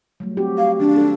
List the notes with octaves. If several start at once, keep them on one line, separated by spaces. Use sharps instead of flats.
F#3 G3 A3
C4 F#4 G4
F5
D#3 D4
G4 A4